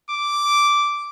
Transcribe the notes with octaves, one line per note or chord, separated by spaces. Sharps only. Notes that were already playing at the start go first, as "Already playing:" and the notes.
D6